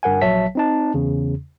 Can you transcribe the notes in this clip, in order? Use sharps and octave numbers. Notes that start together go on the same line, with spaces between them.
G1 G2 A#4 F#5 G#5
A#1 F#3 C#5 E5 A5 B6
C4 D#4 A5
E2 C#3